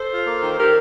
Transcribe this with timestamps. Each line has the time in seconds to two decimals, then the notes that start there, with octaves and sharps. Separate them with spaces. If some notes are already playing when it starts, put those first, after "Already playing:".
Already playing: A4 C5
0.10 F4
0.26 A#3
0.42 D#3
0.58 D#3 G4 A#4